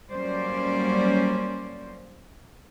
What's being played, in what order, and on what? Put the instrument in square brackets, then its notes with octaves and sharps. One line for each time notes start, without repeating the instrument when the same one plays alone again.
[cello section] F#3 G3 A#3 C#4 C5 D5